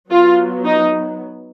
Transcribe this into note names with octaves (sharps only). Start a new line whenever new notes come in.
F#3 B3 F4
D#4